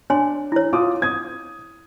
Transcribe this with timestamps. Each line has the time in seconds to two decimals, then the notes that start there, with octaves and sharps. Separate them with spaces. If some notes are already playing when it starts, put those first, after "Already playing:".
0.10 D4 C#5 G#5 C6
0.52 E4 C#5
0.73 F4 D6 D#6
1.02 D#6 G#6